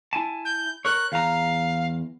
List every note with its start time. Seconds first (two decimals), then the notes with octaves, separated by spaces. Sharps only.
0.13 E4 G#5 A5
0.45 G6
0.85 A#4 C#5 F#6
1.12 E2 F5 A#5